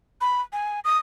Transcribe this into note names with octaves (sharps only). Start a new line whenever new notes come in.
B5
G#5
D#6